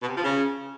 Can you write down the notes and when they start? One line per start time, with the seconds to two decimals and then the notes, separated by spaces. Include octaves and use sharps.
0.01 B2
0.08 C3
0.16 F3
0.23 C#3